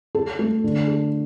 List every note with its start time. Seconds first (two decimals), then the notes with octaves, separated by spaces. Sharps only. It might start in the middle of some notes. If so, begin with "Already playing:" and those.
0.15 A4
0.39 A3
0.64 D3
0.87 A4